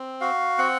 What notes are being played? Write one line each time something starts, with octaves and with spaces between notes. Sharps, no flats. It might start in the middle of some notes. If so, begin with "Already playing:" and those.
Already playing: C4
F#4 F5
C4 F#5